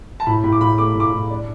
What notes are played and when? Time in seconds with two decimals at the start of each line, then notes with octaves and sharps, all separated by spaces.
0.20 A5
0.26 A2 B5
0.44 A2 B5
0.52 D6
0.61 A2 B5
0.78 A3 D6
0.95 A2 D6
1.13 A2
1.30 D4